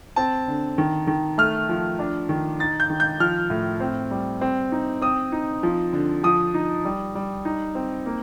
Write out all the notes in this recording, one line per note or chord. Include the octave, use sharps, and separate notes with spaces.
C4 A5
D3
D#3
D#3
A3 F6
F3
D4
D#3
D#4 A6
G6
D#3
G6
F3 F6
A2
C4
G3
C4
D#4
C4 D#6
D#4
F3
D3
F3 D#6
D#4
G3
G3
D#4
C4
A#3